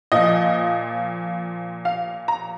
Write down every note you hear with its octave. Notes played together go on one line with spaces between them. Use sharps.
A#2 F3 D#5
F5
A#5